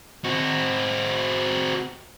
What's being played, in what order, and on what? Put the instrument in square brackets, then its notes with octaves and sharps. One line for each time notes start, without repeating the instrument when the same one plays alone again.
[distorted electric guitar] C4 F#4